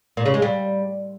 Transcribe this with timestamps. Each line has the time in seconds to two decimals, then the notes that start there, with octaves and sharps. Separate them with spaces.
0.17 A#2
0.25 C#3
0.34 G#3
0.42 G3